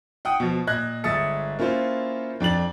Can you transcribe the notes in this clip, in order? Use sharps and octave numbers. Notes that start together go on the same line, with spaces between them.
F#5 G5 D#6
B2 F3
A#2 D#5 F#6 G#6
G1 G#3 E5 D#6 A6 C#7
A#3 C#4 E4 F4 C5
F2 D4 A6 F#7